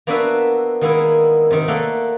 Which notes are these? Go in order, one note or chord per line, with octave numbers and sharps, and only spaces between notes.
A#3 B3 D4 F#4 B4 E5
D#3 G#3 A#3 B3 E4
C3 D#3 A#4
A3 A#3 A4 D5 F#5